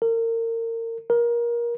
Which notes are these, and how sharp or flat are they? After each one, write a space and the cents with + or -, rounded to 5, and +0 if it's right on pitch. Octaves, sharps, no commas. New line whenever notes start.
A#4 -30
A#4 +25